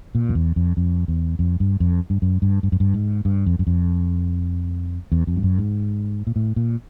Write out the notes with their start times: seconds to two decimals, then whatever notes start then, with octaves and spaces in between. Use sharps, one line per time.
0.15 A#2
0.29 F2
0.35 E2
0.56 F2
0.77 F2
1.08 E2
1.39 F2
1.60 G2
1.80 F2
2.10 G2
2.22 F#2
2.42 G2
2.63 G2
2.72 F#2
2.80 G2
2.94 G#2
3.25 G2
3.46 F2
3.59 F#2
3.67 F2
5.12 E2
5.27 F2
5.36 G2
5.43 F#2
5.58 G#2
6.27 A#2
6.36 A2
6.56 A#2